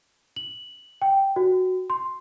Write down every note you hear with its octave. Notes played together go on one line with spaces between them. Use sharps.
F#7
G5
F#4
C6